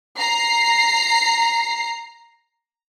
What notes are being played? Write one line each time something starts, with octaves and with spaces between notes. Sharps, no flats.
A#5 C7